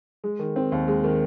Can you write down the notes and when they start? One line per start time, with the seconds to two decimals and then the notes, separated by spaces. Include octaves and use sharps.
0.24 G#3
0.39 D#3
0.56 C4
0.72 D#2
0.88 G#3
1.04 D#3